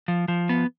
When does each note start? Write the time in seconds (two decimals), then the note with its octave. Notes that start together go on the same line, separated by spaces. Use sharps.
0.08 F3
0.28 F3
0.49 B3